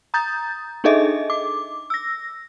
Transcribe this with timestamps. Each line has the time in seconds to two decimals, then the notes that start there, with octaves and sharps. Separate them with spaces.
0.14 A#5 D#6 G6 A6
0.84 D4 D#4 G#4 A4 D#5 E5
1.30 D6
1.90 E6 A#6